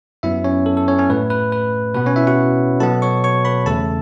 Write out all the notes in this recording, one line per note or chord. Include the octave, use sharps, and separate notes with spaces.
F#2 F#3 B3 E4 E5
C#4 C#5
A4
A4
C#4 C#5
C#4 C#5
A2 A3 B4
B4
B4
B2 B3 B4
C#4 C#5
E4 E5
F#4 F#5
B2 F#3 B3 A4 A5
C#5 C#6
C#5 C#6
B4 B5
E2 C#3 A3 A4 A5